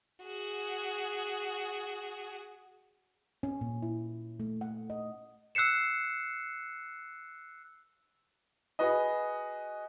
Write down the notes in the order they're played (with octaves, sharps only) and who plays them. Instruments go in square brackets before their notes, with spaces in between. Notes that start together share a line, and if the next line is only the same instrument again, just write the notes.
[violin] F#4 G#4
[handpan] C#4
A#2
E4
A3
F#5
D#5
[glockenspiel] E6 F#6 C7 C#7 E7
[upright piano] F#4 G#4 B4 D#5